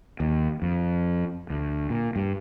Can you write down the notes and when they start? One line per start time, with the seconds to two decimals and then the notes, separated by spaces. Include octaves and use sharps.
0.20 D#2
0.62 F2
1.50 D2
1.90 A#2
2.16 G2